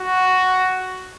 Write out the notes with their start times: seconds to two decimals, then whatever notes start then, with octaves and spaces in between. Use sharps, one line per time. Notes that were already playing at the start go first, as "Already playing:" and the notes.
Already playing: F#4